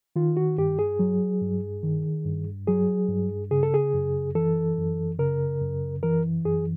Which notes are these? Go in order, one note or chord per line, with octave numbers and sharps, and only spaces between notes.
D#3 F4
F#4
G2 G4
G#4
F#3
G2
D#3
G2
F#3 G#4
G2
C#3 G#4
A4
G#4
F#2
E3 A4
F#2
C#3 A#4
F#2
E3 A#4
F#2 G#4